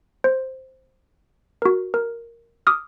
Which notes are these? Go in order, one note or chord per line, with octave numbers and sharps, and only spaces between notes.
C5
F#4 A#4
A#4
D6 D#6 F6